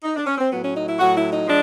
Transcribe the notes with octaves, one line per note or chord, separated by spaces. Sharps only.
D#4
D4
C#4
C4
A2 F#3 B3
C#4
D#4
E4
A2 F#3 F#4
E4
D#4
F3 G#3 D4